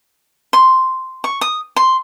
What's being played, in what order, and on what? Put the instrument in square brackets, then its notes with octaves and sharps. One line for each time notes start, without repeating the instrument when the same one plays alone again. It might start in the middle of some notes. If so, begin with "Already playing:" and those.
[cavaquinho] C6
C#6
D#6
C6